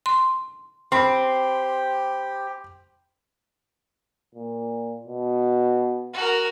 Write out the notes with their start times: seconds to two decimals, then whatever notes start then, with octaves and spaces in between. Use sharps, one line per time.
0.06 C6
0.92 C4 G4 B5 C6
4.35 A#2
5.07 B2
6.14 F#4 A#4